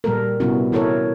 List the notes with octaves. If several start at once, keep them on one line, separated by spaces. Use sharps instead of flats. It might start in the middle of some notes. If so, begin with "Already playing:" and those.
A#2 G3 G#3 A#3 A4 A#4
C3 G3 B3 C#4 E4 F#4
E3 E4 A4 A#4 C#5